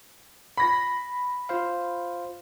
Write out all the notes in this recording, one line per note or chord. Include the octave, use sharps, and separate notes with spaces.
B5 A#6
F4 C5 F5